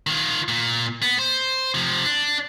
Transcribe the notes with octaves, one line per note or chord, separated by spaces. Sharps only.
D#3 F4
A#2
B3
C5
C3 F3
D4